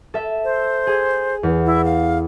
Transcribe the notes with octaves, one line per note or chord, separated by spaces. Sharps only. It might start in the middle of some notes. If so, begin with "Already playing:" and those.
A4 E5
C5
G#4
E2
E4
F5